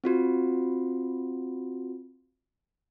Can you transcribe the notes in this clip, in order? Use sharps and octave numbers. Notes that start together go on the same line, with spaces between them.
C4 F4 F#4